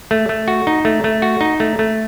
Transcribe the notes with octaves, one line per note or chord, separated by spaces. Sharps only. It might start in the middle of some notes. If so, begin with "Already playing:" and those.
A3
A3
F#4
D#4
A3
A3
F#4
D#4
A3
A3